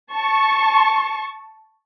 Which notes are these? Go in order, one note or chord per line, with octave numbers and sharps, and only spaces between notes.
A5 C#6